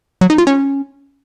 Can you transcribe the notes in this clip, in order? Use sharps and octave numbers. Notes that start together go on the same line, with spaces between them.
F#3
D#4
F4
C#4